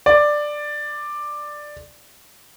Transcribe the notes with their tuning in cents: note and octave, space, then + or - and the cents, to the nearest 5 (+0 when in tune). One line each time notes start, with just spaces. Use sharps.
D5 +10